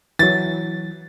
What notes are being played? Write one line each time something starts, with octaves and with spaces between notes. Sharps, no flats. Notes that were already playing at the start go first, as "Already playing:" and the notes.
E3 F#3 A6